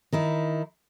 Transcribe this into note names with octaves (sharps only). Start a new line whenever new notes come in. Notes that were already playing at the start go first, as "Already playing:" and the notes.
D#3 D#4 E4